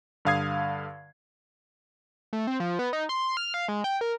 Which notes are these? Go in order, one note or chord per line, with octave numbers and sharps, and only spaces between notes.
G2 D3 F5 D#6 G#6 C7
A3
C4
F3
B3
D#4
C6
F6
F5
G#3
G5
A#4